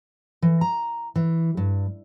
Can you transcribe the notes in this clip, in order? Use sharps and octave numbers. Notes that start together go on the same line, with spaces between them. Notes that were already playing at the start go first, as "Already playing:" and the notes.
E3
A#5
E3
G2